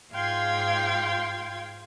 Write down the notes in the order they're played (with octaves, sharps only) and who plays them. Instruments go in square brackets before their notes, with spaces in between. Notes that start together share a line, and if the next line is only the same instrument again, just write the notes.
[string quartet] G#2 F4 F5 G5 C6 G#6